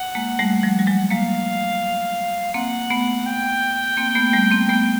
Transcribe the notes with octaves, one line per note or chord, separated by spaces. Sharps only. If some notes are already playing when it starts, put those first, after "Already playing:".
Already playing: F#5
G#3 A#3
G3 A3
F3 G3
G3
F#3 G#3
G#3 A#3 F5
A#3 C4 F#5
A3 B3
G5
A#3 C4
A3 B3
G3 A3
A#3 C4
A3 B3